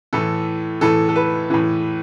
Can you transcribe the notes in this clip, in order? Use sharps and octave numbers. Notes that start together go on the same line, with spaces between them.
A2 E3 A4
A2 E3 A4
A4
B4
A2 E3